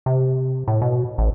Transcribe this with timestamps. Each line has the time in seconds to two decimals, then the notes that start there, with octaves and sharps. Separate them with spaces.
0.06 C3
0.68 A2
0.82 B2
1.18 A1